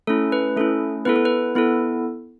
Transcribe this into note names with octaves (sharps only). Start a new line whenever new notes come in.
A3 C#4 E4 A4
B4
A3 C#4 E4 A4
B3 E4 A4 B4
A4
B4
B3 E4 A4